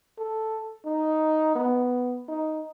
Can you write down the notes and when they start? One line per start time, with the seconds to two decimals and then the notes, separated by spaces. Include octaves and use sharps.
0.18 A4
0.85 D#4
1.55 B3
2.28 D#4